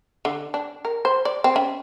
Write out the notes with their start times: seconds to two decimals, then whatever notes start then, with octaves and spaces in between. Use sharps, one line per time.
0.25 D3
0.54 D4
0.85 A#4
1.05 C5
1.25 D5
1.44 C4
1.56 C#4